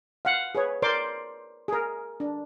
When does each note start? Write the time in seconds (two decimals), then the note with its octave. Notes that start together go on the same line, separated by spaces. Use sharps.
0.25 F5 F#5
0.55 G#4 B4 C#5
0.82 A#4 C5 D5 C6 D6
1.68 G#4 A#4
2.20 D4